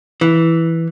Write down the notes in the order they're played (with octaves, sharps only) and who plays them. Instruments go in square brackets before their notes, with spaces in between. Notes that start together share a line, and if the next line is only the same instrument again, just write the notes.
[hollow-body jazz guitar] E3